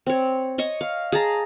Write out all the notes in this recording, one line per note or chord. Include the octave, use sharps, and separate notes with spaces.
C4 C#5
C#5 D#5 C#6
F5
G#4 A5 A#5